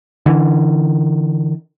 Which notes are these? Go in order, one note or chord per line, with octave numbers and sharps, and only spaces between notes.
D3 E3